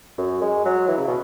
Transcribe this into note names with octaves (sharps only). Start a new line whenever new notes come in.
F#2
G#3
F#3
E3
C#3
B2